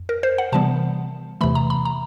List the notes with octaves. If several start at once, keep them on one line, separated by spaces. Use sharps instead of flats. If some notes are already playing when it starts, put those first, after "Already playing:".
Already playing: F2
A#4
C5
F#5
C3 E3 G3 B3 A5
E2 C3 E3 A3 B5
A#5
B5
A#5